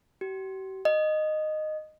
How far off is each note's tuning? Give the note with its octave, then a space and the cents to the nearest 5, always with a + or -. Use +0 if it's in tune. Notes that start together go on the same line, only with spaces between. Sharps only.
G4 -45
D#5 -10